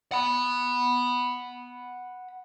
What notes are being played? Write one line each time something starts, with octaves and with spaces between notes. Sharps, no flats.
F#5 B5